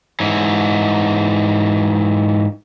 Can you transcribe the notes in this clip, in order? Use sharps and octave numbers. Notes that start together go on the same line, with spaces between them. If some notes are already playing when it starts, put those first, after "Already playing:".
G#2 E3